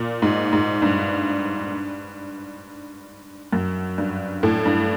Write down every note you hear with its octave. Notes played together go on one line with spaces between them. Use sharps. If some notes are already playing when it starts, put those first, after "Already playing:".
Already playing: A#2
G#2
G#2
G2
F#2
G2
A2
G2